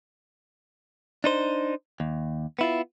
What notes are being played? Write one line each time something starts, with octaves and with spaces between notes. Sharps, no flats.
D4 D#4 C5
D#2
B3 E4 F4